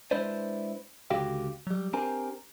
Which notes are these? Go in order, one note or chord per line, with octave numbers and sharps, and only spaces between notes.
G#3 D4 E4 B4 C5 D5
C#2 D3 F#4 G4 F5 G5
F#3 G3
C4 D4 G4 A#4 C5 G#5